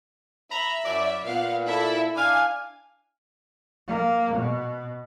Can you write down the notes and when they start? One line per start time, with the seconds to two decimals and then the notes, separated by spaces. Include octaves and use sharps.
0.52 E5 A#5 B5
0.85 F#2 E4 D5
1.25 A#2 B3 F5 F#5
1.67 E4 A4 E5
2.16 D4 F5 G#5
3.88 A#3
4.35 B2